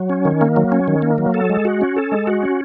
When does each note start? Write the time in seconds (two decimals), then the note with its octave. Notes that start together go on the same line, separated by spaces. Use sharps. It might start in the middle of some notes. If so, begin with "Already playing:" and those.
Already playing: F#3
0.10 C#4
0.25 D#3
0.41 A#3
0.56 F#3
0.72 C#4
0.88 D#3
1.02 A#3
1.18 F#3
1.34 A4
1.50 G#3
1.65 F#4
1.81 C#4
1.96 A4
2.12 G#3
2.27 F#4
2.43 C#4